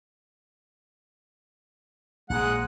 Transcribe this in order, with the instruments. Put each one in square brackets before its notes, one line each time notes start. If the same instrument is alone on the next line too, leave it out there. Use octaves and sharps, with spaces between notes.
[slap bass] A#1 [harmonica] G#3 F#5